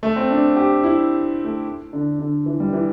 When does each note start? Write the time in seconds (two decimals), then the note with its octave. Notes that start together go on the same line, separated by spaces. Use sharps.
0.03 A3
0.16 C4
0.30 D4
0.56 G4
0.84 E4
1.44 A3
1.93 D3
2.19 D3
2.46 E3
2.60 G3
2.73 E3